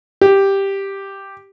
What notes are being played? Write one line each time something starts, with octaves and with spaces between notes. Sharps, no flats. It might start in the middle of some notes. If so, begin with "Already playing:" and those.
G4